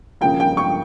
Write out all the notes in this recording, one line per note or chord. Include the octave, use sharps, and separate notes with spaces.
C#3 F3 A#3 G5
G5
C#6